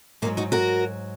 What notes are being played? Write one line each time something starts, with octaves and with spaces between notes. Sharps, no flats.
G#2 F#3 A#3
D#4 F#4
F#4 A#4